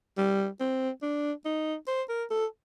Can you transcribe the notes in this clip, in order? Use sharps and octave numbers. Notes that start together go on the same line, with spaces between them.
G3
C4
D4
D#4
C5
A#4
A4